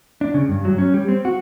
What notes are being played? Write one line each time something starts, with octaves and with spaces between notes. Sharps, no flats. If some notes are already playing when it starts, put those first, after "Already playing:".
D4
C#3
G2
F#3
C#4
G3
C4
F#4